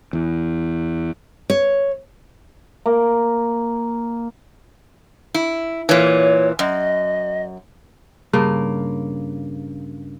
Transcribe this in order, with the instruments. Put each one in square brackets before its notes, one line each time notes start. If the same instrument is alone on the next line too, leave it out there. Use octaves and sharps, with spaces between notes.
[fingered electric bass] E2
[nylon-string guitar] C#5
[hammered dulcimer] A#3
[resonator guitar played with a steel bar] E4
[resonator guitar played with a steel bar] A#2 E3 [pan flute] C#5
[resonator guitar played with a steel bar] F#2 [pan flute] D#5
[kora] G2 C#3 A#3